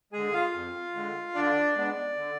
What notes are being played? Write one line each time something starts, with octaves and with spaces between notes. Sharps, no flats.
D3 G#3 G#4 G#5
F4 F5
F2
D3 G#3
D3 D4 D5
G#3 B3 D4
D3